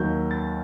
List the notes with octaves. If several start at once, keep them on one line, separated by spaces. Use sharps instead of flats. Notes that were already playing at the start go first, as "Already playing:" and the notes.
Already playing: D#2 D#3 F#3 G6
A6